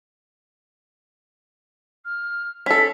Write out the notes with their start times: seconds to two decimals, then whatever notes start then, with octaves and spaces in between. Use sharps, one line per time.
2.05 F6
2.66 C#4 A4 B6